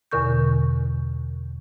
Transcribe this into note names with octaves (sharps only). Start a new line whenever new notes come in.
E2 B2 D3 A#4 C#6 G6